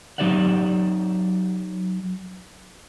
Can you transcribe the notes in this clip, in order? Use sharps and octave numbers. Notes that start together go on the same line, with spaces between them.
F#3 D#4 G4 D5 E5 F#5